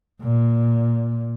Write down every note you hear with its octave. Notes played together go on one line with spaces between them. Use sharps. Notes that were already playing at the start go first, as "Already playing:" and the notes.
A#2